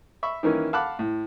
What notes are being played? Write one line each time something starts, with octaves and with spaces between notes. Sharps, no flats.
E5 B5 C#6
D#3 E3 A#3 C#4 E4
F5 F#5 A5 B5 D6 F#6
A2